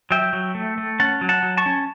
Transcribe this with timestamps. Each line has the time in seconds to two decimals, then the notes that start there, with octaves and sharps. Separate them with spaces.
0.11 F#3 E5 G5
0.33 F#3
0.55 A3
0.78 A3
1.00 C#4 F#5 A5
1.21 F#3
1.29 F#5 A5
1.43 F#3
1.57 A5 C#6
1.66 C#4